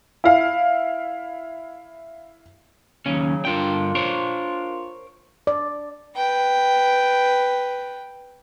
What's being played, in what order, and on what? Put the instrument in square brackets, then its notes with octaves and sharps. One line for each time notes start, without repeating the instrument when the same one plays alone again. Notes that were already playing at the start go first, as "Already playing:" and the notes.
[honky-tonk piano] E4 F5
[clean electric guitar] D#2 C#4 [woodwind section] C#3 F#3
[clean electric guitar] G2 D3 G5 [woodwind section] A#3 D4 F4
[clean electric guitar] A#4 C5 C#5
[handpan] D5
[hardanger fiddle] B4 G5